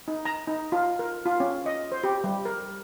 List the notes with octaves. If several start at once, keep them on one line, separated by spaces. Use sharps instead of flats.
D#4
A#5
D#4
F4
A#4
F4
C#4
D#5
C5
G4
G3
A#4